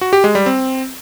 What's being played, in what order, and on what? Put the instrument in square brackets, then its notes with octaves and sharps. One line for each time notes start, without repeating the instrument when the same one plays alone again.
[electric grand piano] F#4
G4
G#3
G3
C4